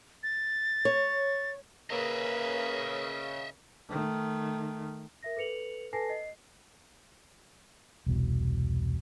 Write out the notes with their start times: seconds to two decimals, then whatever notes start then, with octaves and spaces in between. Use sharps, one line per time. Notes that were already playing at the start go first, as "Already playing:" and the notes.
0.23 A6
0.85 C#5
1.90 C#3 A#3 B4 D#5 E5
3.89 D#3 A3
5.23 A#4 E5 A#6
5.37 A4 B4 C#7 F7 F#7
5.93 A4 B4 G#5 A5 A#6 C7
6.09 D#5 C7
8.06 E1 C2 B2